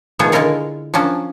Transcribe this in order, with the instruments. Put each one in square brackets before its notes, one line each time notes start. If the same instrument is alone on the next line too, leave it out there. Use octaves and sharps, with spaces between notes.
[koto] B2 D#3 F3 A3 B3 G#4
D3 G#3 E4 F4 A#4 C#5
F3 F#3 C#4 D4